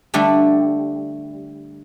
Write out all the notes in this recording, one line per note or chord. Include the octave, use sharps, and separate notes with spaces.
D3 G3 A3 D4